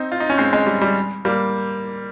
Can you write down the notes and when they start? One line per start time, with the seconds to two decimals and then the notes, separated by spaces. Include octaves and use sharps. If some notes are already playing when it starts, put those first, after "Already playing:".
Already playing: C4 D#4
0.12 F4
0.20 D#4
0.30 C#4
0.38 G#3 C4
0.53 G#3
0.67 G3
0.82 G3
1.25 G3 A#3